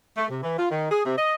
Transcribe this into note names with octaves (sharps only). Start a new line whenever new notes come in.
A3
C3
E3
F4
D#3
G#4
C3
D#5